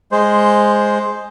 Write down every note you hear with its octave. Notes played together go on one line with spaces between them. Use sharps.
G#3 C5